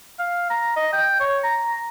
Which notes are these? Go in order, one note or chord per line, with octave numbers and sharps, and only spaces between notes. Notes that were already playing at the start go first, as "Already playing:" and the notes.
F5
A#5
D#5
G5
C#5
A#5